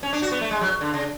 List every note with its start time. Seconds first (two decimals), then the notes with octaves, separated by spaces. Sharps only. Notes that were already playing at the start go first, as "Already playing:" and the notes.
0.03 C#4
0.13 D4
0.22 F#4
0.32 B3
0.41 A3
0.51 G#3
0.61 F#3
0.81 D3
0.94 C#3